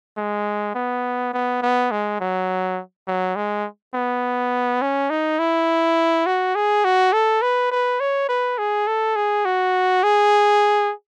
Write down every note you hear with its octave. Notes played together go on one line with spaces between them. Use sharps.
G#3
B3
B3
B3
G#3
F#3
F#3
G#3
B3
C#4
D#4
E4
F#4
G#4
F#4
A4
B4
B4
C#5
B4
G#4
A4
G#4
F#4
G#4